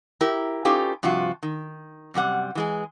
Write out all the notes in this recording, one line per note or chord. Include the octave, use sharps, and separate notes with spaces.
E4 G4 A#4
C#4 D#4 F4 G4 A4 B4
G2 C3 F3 F4 F#4
D#3
F#2 C3 G3 F#5
E3 G#3 G#4